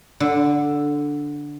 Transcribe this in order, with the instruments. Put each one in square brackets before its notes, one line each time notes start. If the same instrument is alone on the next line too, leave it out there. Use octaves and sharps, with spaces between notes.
[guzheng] D3